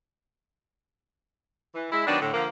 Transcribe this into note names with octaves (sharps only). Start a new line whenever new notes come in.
E3
G#3 E4
D#3 F#3 B3 D4
A2 D3
D3 F3 A#3